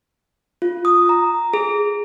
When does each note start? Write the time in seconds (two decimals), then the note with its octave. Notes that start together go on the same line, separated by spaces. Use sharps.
0.62 F4
0.85 D#6
1.09 A#5
1.53 G#4